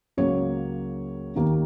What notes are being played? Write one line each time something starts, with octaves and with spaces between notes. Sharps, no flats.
C#2 C#3 F#3 A#3 C#5
D#2 D#3 A#3